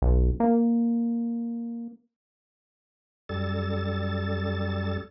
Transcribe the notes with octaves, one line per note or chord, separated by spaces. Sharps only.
B1
A#3
F#2 G3 A4 A6